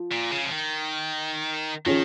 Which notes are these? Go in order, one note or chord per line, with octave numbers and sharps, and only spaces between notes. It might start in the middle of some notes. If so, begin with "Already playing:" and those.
Already playing: F3
A#2
C#3
F3
D#3
D#3 F3 C#4 G#4 C#5